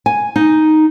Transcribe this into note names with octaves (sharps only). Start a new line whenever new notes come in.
G#5
D#4